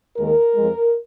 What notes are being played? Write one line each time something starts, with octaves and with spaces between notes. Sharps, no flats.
D#2 D#3 G#3 A#4
F2 F3 G#3